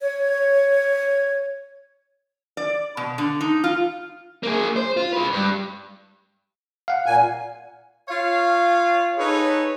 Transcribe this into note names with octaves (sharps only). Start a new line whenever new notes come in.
C#5 G#6
D5
B2
D3
D#4
F4
A#3 G#4
C5
F4
G#3 B4
G2
F5 F#5
A#2 G#5
F4 C#5 F5
D#4 G#4 A4 B4 C#5